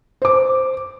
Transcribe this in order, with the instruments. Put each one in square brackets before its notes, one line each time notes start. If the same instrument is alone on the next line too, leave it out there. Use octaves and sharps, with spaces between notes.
[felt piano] C5 D6